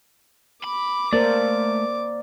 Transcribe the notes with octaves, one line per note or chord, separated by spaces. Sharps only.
B5 D6
A3 A#3 A#4 C5 D5